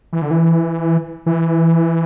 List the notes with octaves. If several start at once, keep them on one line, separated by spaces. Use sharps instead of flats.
E3
D3
E3
E3